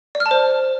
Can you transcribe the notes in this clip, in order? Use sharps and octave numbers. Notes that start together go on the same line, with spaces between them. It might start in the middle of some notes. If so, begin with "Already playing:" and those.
D5
F6
A5
C5